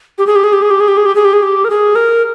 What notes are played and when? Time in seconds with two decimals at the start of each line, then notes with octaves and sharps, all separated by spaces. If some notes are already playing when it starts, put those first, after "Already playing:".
0.18 G4
0.27 G#4
0.36 G4
0.44 G#4
0.53 G4
0.62 G#4
0.71 G4
0.80 G#4
0.88 G4
0.97 G#4
1.06 G4
1.15 G#4
1.25 G4
1.33 G#4
1.42 G4
1.65 A#4
1.70 G#4
1.95 A#4